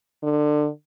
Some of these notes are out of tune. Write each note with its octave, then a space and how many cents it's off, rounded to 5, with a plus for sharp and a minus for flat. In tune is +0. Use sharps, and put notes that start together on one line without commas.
D3 +25